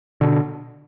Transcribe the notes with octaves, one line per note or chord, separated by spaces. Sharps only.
B2 D3